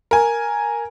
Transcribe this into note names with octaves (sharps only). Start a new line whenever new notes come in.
A#4 G#5